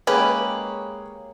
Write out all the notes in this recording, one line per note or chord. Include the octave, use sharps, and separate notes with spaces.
G#3 A#3 C#4 G4 G#4 B4 C#5